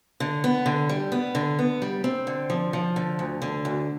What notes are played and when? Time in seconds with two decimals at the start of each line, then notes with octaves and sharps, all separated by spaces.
0.20 D3
0.44 B3
0.66 D3
0.89 G3
1.12 B3
1.35 D3
1.59 B3
1.82 G3
2.04 C4
2.27 D3
2.50 F3
2.73 F3
2.96 D3
3.19 D2
3.42 D3
3.65 D2